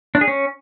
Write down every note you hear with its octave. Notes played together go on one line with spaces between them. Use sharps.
D4
G#4
C#4